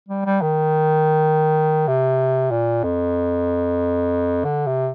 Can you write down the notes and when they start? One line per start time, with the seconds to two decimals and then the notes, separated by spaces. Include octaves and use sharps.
0.08 G3
0.25 G3
0.42 D#3
1.87 C3
2.51 A#2
2.83 F2
4.45 D3
4.67 C3